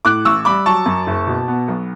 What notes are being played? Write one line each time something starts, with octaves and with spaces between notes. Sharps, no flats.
A2 D6 F#6
A1 C#6 E6
G3 B5 D6
F#3 A5 C#6
F#2
F#1
B2
B3
B1